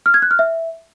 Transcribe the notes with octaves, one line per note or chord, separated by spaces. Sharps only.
F6
G#6
F#6
F6
E5